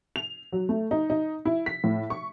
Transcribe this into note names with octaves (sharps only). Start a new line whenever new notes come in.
F7
F#3
A3
D#4
D#4
E4
B6
A2
C#6